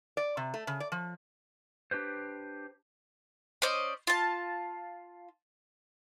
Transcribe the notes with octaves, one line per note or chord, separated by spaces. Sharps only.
D5
C3
A3
C#3
D5
F3
D4 G4 B4 C5
C#4 C5 D5 D#5
F4 A5